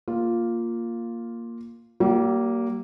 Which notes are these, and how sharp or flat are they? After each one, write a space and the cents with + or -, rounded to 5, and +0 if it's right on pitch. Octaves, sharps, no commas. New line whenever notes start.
A#3 +0 F4 +0
G3 -40 A#3 +0